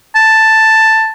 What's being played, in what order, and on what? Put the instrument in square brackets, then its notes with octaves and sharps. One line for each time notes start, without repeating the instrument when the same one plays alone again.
[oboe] A5